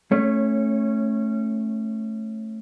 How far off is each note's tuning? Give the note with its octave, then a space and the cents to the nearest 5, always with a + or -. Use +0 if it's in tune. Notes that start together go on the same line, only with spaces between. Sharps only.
A3 +0 C#4 -20 C#5 +0